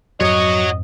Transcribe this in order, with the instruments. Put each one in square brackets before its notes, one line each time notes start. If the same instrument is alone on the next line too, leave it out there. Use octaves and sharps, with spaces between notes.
[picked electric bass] F2 G#2 C4 [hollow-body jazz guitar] F#3 [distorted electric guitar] F#4 C#5 [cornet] D#5